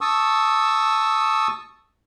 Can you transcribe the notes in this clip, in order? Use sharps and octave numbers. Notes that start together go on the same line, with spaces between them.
A5 C#6 D#6 E6